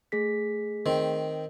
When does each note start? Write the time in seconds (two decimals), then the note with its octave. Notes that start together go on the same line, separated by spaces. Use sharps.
0.12 A3 G#4 B6
0.86 D#3 C4